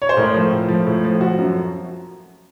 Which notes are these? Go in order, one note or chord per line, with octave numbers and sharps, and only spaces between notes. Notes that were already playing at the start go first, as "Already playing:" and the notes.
C#5
C5
A2 A#4
F3
A2
F3
A2
F3
F3 F#4
F#2